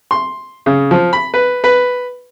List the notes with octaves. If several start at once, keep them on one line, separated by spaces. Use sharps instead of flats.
C6
C#3
F3
B5
B4
B4